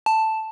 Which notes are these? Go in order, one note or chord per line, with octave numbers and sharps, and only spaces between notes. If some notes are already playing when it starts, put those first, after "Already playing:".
A5